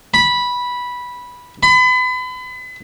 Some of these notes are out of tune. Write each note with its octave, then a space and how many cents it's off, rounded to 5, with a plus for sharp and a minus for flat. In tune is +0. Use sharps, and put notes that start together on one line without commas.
B5 -10
B5 +35